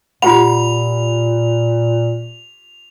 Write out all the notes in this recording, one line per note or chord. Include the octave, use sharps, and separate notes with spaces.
A#2 F4 G4 F#5 B5 F7